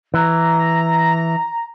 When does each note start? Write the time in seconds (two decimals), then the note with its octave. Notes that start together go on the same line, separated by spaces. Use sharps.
0.14 E3 A#5